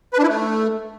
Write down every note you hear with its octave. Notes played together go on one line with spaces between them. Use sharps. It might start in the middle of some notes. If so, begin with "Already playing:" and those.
B4
D4
E4
A3